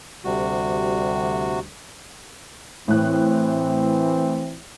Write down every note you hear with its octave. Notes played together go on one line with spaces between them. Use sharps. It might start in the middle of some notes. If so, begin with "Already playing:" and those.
D2 C3 G3 F#4
A2 E3 C4 F#6